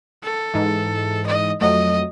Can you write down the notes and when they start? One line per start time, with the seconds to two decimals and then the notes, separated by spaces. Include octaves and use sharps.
0.23 A4
0.54 G#2 E3
1.27 D#5
1.61 F2 F#3 A3 D#5